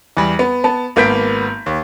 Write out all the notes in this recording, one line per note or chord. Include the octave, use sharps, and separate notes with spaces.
E2 G3
B3
B3 A5
G#1 A#3 B3 G6 B6 D7
D#2